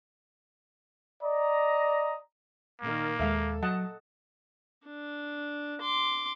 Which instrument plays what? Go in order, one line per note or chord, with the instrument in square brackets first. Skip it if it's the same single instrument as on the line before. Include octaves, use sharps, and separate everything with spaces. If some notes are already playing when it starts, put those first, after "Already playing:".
[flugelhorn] D5 [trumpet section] D#5 A#5
[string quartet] A#2 D#3 [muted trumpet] A#3
[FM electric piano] D#2 G#3 [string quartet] A4 [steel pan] E5 F5
[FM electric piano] F#3 [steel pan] D#5 F#5 A5
[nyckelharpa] D4
C6 D6